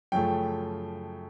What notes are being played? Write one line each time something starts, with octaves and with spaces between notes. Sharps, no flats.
F#2 C#3 F3 A3 G5